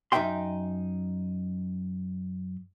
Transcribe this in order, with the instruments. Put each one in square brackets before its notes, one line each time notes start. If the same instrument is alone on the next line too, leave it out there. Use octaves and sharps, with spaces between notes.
[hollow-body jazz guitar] F#2 D#4 E5 F5 G5 C6